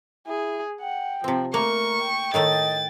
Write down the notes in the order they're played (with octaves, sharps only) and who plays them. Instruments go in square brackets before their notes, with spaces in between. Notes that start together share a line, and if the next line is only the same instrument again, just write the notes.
[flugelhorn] E4 [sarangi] G#4
[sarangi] F#5 [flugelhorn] G5
[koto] C3 C4 [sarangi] F3
[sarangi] A3 [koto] A#3 [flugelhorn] A#4 [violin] C#6
[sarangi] G5
[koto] A2 D#3 A3 [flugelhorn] D#5 [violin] A6